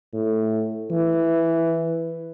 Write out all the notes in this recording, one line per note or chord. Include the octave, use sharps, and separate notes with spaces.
A2
E3